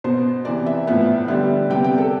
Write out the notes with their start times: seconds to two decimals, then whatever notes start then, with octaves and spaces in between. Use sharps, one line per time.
0.04 B2 B3 C5
0.45 C3 E3 B3 D5
0.66 E5
0.87 A2 F3 B3 E5
1.28 D3 G3 B3 E5
1.70 C3 G3 B3 G5
1.84 G5
1.98 A4